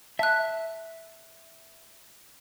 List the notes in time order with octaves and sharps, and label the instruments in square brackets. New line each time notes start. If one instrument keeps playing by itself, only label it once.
[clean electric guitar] E5 [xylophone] A5 F#6